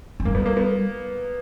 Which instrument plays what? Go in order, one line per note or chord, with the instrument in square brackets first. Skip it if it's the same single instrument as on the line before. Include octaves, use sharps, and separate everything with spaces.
[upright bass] E3
[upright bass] G3 [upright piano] A#3
[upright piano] B3
A#3
B3